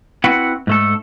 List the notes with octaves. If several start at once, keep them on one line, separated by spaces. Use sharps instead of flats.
C4 E4 F#4 B4 F#5
G#2 A3 A4